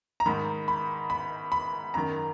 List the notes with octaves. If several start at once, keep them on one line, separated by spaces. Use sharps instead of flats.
A#5
G#2 D#3 B5
B5
B5
B5
F#2 D#3 A#5